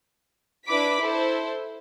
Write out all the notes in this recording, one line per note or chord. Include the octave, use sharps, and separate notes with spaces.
D4 E4 B4 B5 D6 B6
E4 A4 C5